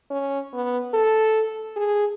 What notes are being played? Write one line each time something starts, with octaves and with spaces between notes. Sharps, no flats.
C#4
B3
A4
G#4